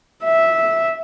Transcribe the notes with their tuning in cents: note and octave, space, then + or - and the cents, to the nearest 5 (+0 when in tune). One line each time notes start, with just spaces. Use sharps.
E5 -10